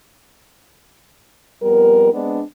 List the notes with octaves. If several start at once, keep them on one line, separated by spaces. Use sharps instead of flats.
F2 G3 B3 A#4
G#3 B3 C4 D4